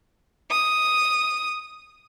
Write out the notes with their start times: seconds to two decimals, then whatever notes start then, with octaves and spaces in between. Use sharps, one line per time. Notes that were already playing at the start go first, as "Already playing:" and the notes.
0.51 D#6